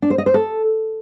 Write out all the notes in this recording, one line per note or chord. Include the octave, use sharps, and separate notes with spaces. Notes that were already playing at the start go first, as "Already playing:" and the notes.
D4
C5
D#5
C5
A4